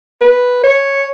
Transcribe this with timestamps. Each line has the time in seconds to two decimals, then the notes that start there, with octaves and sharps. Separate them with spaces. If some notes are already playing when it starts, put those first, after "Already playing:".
0.21 B4
0.64 C#5